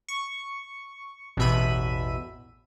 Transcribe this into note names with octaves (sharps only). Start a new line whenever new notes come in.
C#6
A1 E2 B2 E5 B5 D#7